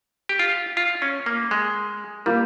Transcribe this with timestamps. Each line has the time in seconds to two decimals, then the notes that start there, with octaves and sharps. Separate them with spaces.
0.29 G4
0.39 F4
0.77 F4
1.02 C#4
1.26 A#3
1.51 G#3
2.26 G3 A#3 F4 A#4